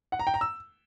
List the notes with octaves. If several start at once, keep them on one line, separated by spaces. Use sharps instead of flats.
F#5
A#5
G5
A#5
E6